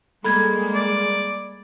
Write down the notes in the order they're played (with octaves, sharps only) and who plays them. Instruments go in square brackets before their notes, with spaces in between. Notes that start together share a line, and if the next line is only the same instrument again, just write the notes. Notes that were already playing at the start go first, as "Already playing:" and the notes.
[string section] G3 G#3 A#3 [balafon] A4 [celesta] B5 G#6
[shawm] D5